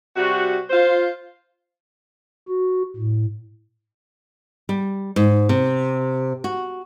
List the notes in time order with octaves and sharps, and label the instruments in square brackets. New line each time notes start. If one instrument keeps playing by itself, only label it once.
[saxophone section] C3 G3 F#4
F4 C5
[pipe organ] F#4
A2
[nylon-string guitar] G3
G#2
C3
F#4